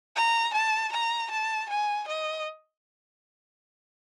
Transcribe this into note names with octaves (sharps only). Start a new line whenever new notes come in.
A#5
A5
A#5
A5
G#5
D#5